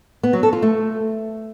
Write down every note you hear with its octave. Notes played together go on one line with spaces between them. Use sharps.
B3
F#3
A4
F4
A3